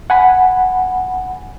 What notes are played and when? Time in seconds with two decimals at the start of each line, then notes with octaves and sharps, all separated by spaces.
0.10 F#5 G#5 B5